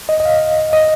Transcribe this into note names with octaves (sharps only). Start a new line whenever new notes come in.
D#5
D#5
F5
D#5